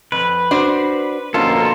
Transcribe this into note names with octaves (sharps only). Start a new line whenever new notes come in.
F2 B4
D4 F#4 C5
F2 B2 D3 F3 A#3 C#4 F4 A4